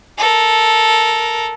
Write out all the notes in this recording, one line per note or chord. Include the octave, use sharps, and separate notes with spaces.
A4 A#4